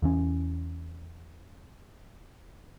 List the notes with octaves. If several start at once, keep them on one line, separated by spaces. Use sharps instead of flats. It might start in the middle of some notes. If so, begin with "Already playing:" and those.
E2 E3 C#4